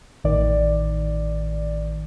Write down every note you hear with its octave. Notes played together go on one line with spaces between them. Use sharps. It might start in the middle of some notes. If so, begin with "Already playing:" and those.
A1 D#3 D5